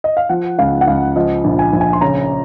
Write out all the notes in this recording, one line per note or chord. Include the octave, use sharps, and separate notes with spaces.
D#5
F5
F3 F#5
C#2 F5
F#5
C#2 F5
F3 D#5
A#1
G#5
A#1
G#5
C6
C#3 A#5